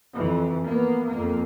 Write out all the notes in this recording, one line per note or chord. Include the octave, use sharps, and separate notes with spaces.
F2 E3
A#3 B3
F2 A#3